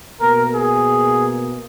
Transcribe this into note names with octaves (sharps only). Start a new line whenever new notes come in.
B2 A#3 A#4
G#4